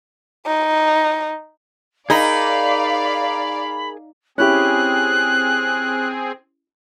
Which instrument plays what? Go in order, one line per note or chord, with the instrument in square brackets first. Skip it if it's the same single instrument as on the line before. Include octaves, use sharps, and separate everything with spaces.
[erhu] D#4
[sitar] D#4 [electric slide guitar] G#4 A#4 [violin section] D5 F5 [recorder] B5
[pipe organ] C4 G#4 [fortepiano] C#4 E4 G4 [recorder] F#6